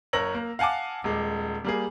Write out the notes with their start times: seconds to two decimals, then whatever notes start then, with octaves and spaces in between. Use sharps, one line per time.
0.13 F#1 A#4 C#5 E6 A#6 F#7
0.35 A#3
0.59 F5 F#5 G#5 A5 D6
1.04 D#1 G#3
1.64 G3 A#3 G#4